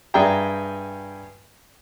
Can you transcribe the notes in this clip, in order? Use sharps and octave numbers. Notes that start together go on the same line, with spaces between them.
G2 G#4 D5 E5 G5 A#5